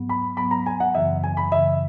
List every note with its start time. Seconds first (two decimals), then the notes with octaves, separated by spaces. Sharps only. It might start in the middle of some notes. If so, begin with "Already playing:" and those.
Already playing: G#2 F#3 B3
0.09 B5
0.37 G#2 F#3 B3 B5
0.51 A#5
0.66 G#5
0.80 F#5
0.94 F#2 C#3 E3 E5
1.24 G#5
1.37 B5
1.51 F#2 C#3 E3 E5